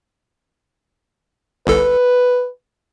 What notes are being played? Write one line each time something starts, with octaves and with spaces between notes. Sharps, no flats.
G1 C2 A4 B4